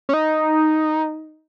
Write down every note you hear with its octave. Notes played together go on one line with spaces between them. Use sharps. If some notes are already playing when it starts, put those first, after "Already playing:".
C#4
D#4